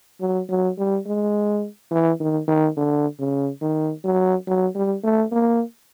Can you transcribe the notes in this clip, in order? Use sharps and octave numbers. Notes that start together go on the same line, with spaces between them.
F#3
F#3
G3
G#3
E3
D#3
D#3
D3
C#3
D#3
F#3
F#3
G3
A3
A#3